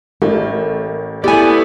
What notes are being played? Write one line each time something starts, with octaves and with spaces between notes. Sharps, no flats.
A1 A3 A#4
A3 B3 E4 G4 D5 G#5